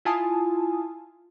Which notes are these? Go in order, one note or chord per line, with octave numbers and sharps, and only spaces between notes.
E4 F4 G#5 A5 D#6